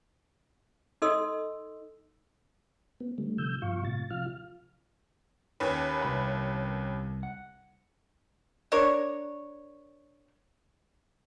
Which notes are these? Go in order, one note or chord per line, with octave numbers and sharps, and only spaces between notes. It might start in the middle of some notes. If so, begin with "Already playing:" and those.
D#4 A4 D#5 C6 E6
B3
D3 G3 A3
C3 F3 E6 G6
G2 B2 F3 F4 F5 C#6
A2 C3 A6
C3 F3 F4 F5 F6
D#2 C#4 B4
C2 B5
F#5
D4 A#4 C#5